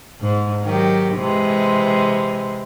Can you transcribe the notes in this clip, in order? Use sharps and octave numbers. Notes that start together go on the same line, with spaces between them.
G#2
D#3 F#3 G4
C3 E3 G#3